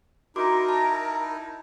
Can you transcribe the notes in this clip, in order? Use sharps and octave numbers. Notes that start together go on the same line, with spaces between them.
D#4 E4 F#4 A#4 C6 D6
A5 B5